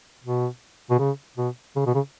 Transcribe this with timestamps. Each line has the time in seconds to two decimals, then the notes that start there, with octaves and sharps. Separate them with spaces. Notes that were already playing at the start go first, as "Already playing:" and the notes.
0.24 B2
0.90 B2
0.99 C#3
1.37 B2
1.76 C#3
1.86 B2
1.95 C#3